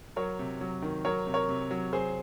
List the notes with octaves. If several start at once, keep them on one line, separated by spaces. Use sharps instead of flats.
F#3 A#4 C#5
C3
F#3
D#3
F#3 A#4 C#5
C3
A#4 C#5
C3
F#3
F#3 G#4 C5